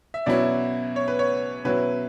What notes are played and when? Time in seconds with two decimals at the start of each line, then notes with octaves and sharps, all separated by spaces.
0.14 E5
0.26 B2 F#3 C#4 E4 D5
0.96 C#5
1.08 B4
1.19 C#5
1.65 B2 F#3 C#4 E4 B4